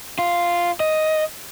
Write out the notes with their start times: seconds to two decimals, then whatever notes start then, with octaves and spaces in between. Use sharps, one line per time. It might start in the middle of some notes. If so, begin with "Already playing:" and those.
0.19 F4
0.80 D#5